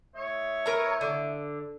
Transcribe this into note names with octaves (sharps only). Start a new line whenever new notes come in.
A2 C#5 D#5 E5
A#4 B4 A#5
D3